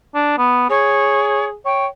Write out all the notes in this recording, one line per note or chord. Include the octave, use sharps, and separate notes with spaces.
D4
B3
G#4 C#5
C#5 G5